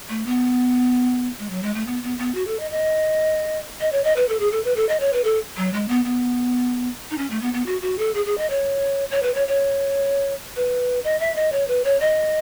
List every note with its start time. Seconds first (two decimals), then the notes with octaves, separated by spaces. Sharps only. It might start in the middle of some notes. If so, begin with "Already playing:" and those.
0.09 A3
0.26 B3
1.39 G#3
1.50 F#3
1.63 G#3
1.75 A3
1.87 B3
2.03 B3
2.18 B3
2.35 F#4
2.47 A4
2.60 D#5
2.71 D#5
3.81 D#5
3.92 C#5
4.04 D#5
4.16 B4
4.29 A4
4.40 G#4
4.52 A4
4.64 B4
4.76 A4
4.89 D#5
5.00 C#5
5.13 B4
5.24 A4
5.57 F#3
5.73 G#3
5.89 B3
6.05 B3
7.11 D#4
7.18 C#4
7.31 A3
7.42 B3
7.54 B3
7.66 F#4
7.82 F#4
7.99 A4
8.15 G#4
8.26 G#4
8.38 D#5
8.50 C#5
9.11 C#5
9.23 B4
9.34 C#5
9.48 C#5
10.56 B4
11.04 D#5
11.20 E5
11.36 D#5
11.52 C#5
11.68 B4
11.85 C#5
12.00 D#5